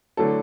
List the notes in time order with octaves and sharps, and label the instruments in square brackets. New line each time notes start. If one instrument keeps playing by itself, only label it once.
[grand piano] D3 F#3 A3 E4 [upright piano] A4